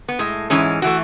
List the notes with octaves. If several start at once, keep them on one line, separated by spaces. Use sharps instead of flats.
B3
A2 G#3
G#2 E3 G#3 C#4
E3 A3 F#4